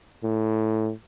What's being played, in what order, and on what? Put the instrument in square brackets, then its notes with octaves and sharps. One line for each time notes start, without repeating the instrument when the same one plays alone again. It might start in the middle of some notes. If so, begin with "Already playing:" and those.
[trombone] A2